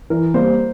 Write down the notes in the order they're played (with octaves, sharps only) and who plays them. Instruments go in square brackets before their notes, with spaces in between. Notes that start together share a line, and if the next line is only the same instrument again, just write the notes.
[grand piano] E3 [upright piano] A#4
[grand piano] G3 A#3 [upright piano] C5